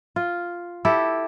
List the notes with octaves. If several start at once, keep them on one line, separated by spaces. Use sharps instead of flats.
F4
E4 G4 A4